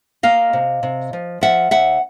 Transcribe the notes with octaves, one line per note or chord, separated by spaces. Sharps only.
A#3 D#5 F5
C3
C3
F3
F3 E5 F#5
D#2 E5 F#5